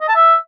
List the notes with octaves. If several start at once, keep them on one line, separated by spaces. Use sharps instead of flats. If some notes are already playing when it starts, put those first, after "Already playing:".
D#5
A5
E5